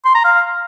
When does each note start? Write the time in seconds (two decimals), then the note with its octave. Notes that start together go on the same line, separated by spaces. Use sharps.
0.05 C6
0.15 A#5
0.24 F5